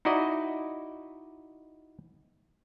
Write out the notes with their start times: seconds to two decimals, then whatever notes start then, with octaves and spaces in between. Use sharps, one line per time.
0.05 D#4 E4 F#4 D5 D#5